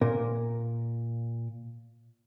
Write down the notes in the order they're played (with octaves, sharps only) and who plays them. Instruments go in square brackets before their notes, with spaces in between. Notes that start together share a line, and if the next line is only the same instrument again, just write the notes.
[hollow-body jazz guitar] A#2 A#4